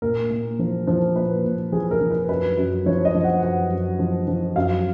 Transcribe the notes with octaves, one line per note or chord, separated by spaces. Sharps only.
A#2 A#4
A#2
F3
F3
A#2 B4
A#2
F3 G#4
A#4
F3
B4
F#2 B4
F#2
F3 C#5
D#5
F3
F#5
F#2 F#5
F#2
F3
F3
F#2 F5